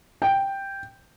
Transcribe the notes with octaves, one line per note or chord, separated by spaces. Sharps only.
G5